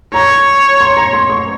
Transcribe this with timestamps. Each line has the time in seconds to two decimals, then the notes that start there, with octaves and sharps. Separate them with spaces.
0.14 C#5 A#5
0.81 C6
0.97 A#5
1.13 C6
1.30 C#6